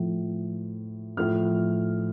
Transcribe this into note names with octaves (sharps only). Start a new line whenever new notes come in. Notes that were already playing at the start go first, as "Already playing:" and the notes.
Already playing: A2 F3
A2 F3 F6